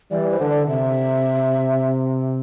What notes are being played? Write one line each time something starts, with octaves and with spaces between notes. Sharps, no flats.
E3 G3 D5
C5
D3
D5
C3 E5